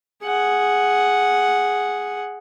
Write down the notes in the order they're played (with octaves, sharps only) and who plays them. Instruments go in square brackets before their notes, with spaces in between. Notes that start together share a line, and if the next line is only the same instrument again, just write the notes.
[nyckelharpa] G#4 F#5